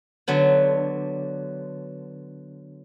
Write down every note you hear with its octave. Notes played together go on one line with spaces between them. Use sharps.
D3 F#3 B3